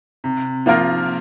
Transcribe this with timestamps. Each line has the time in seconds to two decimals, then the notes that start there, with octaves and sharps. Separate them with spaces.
0.24 C3
0.66 F3 A#3 F4 A#4